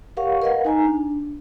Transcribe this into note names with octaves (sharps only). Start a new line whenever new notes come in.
G4 A#4 C#5 F5 F#5 C#6
A#4 B4 D#5 F5 F#5
D#4 G#5 A#5
D4